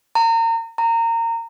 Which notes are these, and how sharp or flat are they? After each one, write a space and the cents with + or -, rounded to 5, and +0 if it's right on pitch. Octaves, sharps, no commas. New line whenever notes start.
A#5 -35
A#5 -25